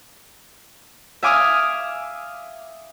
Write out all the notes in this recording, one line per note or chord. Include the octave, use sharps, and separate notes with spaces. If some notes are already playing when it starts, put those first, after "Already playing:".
E5 F5 G#5 D6 D#6 F6